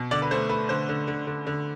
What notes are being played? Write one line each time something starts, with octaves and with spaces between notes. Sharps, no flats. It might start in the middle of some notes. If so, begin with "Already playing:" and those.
Already playing: B2
D3 D5
B4
A3 C5
A3 B4
D3 C5
D3
D3
D3
D3